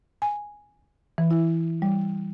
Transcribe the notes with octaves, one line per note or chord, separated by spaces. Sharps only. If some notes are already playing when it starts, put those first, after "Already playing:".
G#5
E3
E4
G3